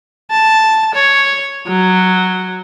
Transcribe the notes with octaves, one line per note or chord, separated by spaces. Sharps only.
A5
C#5
F#3